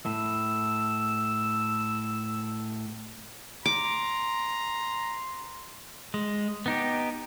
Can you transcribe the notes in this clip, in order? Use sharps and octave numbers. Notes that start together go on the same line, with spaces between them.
A2 E6
A#5 C6 D6
G#3
B3 D#4 G4